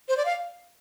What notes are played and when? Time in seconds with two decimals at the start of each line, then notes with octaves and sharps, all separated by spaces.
0.09 C5
0.17 D5
0.25 F5